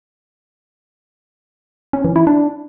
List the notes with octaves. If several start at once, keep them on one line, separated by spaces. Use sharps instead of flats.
C#4
E3
E4
D4